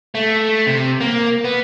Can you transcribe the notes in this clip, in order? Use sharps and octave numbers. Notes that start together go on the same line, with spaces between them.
A3
C3
A#3
B3